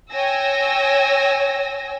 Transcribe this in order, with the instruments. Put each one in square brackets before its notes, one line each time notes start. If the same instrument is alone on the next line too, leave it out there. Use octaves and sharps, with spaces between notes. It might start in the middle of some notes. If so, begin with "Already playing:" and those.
[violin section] C#5 G5 G#5 E6 A#6